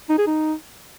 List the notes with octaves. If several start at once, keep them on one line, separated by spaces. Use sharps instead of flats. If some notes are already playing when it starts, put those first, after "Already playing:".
D#4
G#4
D#4